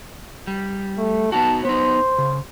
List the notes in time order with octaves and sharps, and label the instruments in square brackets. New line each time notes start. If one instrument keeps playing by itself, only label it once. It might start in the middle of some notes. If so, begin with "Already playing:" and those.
[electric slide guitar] G3
[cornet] A3
[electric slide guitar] B3 D#4 F#4 [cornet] A5
[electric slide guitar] B3 D#4 [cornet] C5
[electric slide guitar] C#3